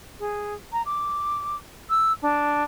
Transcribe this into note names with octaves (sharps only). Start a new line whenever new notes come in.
G#4
A#5
D6
E6
D4